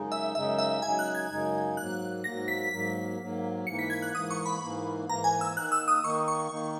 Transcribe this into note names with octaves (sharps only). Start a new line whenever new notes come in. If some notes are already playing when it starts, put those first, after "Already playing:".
Already playing: F#2 C#3 G#3 D#4
E5
F#2 C#3 G#3 D#4 E5
E5
F#2 C#3 G#3 D#4 G#5
F#6
G#6
F#2 C#3 G#3 D#4
G#2 F#3 A#3 F#6
G#2 F#3 A#3 A#6
B6
G#2 F#3 A#3
G#2 F#3 A#3
G#2 E3 A#3 C#7
B6
G#6
F#6
G#2 E3 A#3 D#6
C#6
B5
G#2 E3 A#3
G#2 E3 A#3 A#5
G#5
E6
D#3 A#3 D#4 F#6
E6
D#6
D#3 A#3 D#4 C#6
C#6
D#3 A#3 D#4